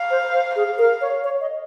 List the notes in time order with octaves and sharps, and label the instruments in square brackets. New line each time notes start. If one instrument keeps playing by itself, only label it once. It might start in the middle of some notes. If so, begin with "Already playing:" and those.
Already playing: [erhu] F5
[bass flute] C5
C5
[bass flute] G#4 [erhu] F5
[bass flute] A#4
C#5
C#5
D#5